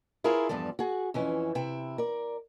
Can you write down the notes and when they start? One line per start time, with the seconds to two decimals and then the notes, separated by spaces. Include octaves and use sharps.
0.24 E4 F4 G#4 A#4 C#5 F5
0.49 E2 G2 F3 A4 D5
0.79 F#4 G#4
1.14 F2 E3 C#4
1.55 C3 E4 G5
1.98 A#4 D5